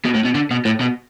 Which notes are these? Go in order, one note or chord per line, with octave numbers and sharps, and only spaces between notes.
B2
A2
B2
D3
B2
A2
B2